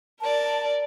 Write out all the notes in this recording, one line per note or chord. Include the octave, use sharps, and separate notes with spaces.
A#4 D5 A5